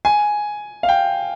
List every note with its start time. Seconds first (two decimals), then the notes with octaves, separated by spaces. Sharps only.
0.05 G#5
0.83 F5
0.89 G5